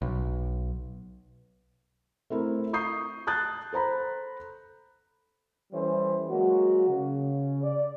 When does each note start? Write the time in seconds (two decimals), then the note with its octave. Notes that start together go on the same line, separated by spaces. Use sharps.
0.02 B1
2.30 A3 C4 E4 A#4
2.73 C#6 D#6 G6 C7
3.27 A5 D#6 F#6 G6 A6
3.73 A4 C5 A#5 B5
5.72 E3 G3 C#4 A4 C5
6.29 F#3 G#3 A#3 F#4
6.87 C#3
7.64 D5